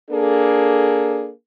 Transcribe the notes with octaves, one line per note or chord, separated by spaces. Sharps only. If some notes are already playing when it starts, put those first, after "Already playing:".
A#3 D4 G#4 A4